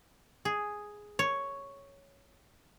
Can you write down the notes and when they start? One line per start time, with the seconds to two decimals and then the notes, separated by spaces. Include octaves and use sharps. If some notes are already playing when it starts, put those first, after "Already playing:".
0.45 G#4
1.19 C#5